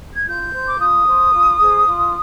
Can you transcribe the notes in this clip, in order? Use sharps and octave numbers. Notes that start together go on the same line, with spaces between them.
G#6
F4 G6
C5
D6
F4 D#6
C5
F4
G#4 C5
F4